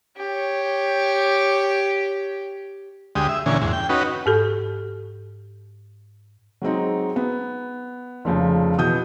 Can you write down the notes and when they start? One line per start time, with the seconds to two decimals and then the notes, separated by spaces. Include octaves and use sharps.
0.17 G4 C#5
3.15 D2 G#3 G4 D#6
3.29 E5
3.46 A#2 D3 E3 C#4 G#5
3.61 E2 G#2
3.73 G5
3.89 C#4 D#4 F#4 B4
4.26 G#2 G4 A4
6.62 F#3 G#3 C4 D#4
7.16 B3
8.25 F1 C#3 F3
8.78 B2 E3 D#6 G6